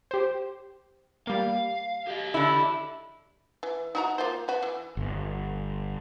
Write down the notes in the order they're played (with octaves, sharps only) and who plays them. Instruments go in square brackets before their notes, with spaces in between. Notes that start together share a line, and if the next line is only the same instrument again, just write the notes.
[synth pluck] G4 C5
[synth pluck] G3 A#3 [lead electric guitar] F5
[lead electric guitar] G4 D#5
[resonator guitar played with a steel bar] D3 E4
[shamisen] E3
D#4 F#4 A#5
A#3 F4 C5
B3 F#4
E3
[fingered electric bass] G1